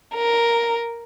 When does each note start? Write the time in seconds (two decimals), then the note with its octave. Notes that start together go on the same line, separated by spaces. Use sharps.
0.15 A#4